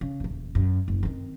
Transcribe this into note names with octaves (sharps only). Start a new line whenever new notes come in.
C#3
D#1 E2
F#2
F#1
D#3 C4